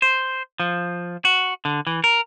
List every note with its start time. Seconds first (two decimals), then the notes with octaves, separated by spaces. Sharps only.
0.02 C5
0.60 F3
1.25 F#4
1.65 D3
1.87 E3
2.04 A#4